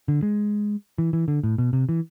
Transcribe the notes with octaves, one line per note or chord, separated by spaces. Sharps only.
D3
G#3
E3
E3
D3
A2
B2
C3
E3